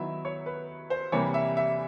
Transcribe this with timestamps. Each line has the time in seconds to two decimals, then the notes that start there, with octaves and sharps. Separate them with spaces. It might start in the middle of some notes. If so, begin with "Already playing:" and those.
Already playing: D#3 F#3 B3 E4 E5
0.25 C#5
0.46 B4
0.90 C5
1.12 C3 E3 G3 A#3 C#5
1.34 E5
1.57 E5